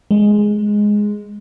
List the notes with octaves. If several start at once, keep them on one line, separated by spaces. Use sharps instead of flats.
G#3